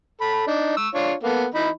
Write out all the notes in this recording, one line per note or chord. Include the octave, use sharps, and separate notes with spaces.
A4 B5
D4 D#4
C#6 E6
D4 F4 C#5
A#3 B3 A4
E3 D#4 B5